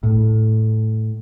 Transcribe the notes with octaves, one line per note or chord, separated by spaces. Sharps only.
A2